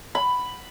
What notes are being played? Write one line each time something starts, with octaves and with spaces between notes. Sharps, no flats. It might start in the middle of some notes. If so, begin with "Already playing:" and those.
B5